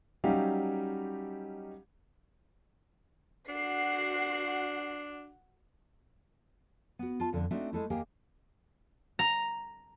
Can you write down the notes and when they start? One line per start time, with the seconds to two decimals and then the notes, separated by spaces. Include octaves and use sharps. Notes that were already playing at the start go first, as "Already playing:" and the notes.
0.24 F#3 G3 C#4 D#4 G4 F5
3.48 D4 F#4 F#5 C7
6.99 B3 F#4
7.20 F4 A5
7.33 F2 D3 D4
7.51 A3 C4 D4 D#4 F#4 E5
7.73 G#3 A3 E4
7.90 D#2 A#3 G4 G#4 A#4 G5
9.19 A#5